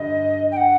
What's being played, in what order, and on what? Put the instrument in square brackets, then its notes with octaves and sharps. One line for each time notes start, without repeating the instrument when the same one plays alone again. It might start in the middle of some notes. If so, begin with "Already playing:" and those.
Already playing: [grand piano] G2 D3 G3 [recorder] D#5
[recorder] G5
F#5